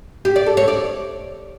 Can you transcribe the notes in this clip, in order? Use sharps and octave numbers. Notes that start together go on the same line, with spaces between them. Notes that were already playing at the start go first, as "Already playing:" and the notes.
G4
D5
A4
C#5
D5